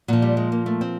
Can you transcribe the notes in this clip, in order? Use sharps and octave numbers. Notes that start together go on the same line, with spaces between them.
A#2 F3 F#3
G3
G#3
A#3
A3
C4